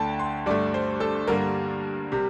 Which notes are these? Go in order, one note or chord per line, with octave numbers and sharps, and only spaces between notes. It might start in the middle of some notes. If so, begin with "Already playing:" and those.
Already playing: D2 D3 A3 G5 A5
C6
G2 D3 A3 D5
C5
A4
G2 D3 G3 A#3 A#4
C3 G3